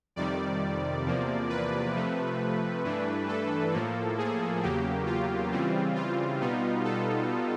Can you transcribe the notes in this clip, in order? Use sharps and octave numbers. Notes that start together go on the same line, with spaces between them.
F2 C3 D#3 G3 D5
E2 C3 F3 A#3
B4
C3 F3 A3
G2 E3 A3 D4
A4
A2 F3 A#3
G#4
E2 C#3 F#3 A#3 G4
F4
C#3 E3 G3 C4
F4
B2 G3 B3 D#4
A4